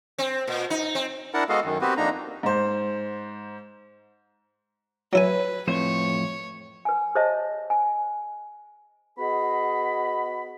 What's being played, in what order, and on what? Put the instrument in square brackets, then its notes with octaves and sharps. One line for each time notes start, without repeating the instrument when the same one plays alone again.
[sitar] C4
A#2
D#4
C4
[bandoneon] D4 E4 A#4 F#5 A5
G#3 B3 F#4 A4 D#5 F5
F#2 D#3
B3 C4 F#4 G4 B4
F2 A#3 D4 D#4 A#5
[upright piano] G#2 C5
[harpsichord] F#3 E4 G#5 [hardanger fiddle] B4
[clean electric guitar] F2 A2 C5 [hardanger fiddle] C#5
[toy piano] B4 G#5
G#4 C5 C#5 D#5 E5 A5
G#5
[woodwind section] B3 F#4 G#4 D#5 B5